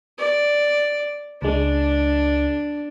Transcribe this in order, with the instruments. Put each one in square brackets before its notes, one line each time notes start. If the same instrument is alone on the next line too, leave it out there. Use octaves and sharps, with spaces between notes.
[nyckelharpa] D5
[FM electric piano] C#2 G#3 [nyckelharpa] D4